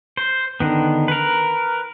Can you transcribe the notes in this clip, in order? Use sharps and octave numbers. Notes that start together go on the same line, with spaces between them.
C5
D3 D#3 B3
A#4 B4